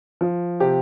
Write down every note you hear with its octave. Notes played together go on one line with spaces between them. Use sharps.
F3
C3 G4